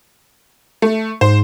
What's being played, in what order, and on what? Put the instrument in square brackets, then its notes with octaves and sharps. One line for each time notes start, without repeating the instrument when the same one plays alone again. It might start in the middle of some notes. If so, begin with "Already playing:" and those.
[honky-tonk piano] A3
[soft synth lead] G#2 [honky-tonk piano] C5